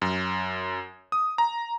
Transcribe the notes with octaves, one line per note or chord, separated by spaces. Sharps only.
F#2
D#6
A#5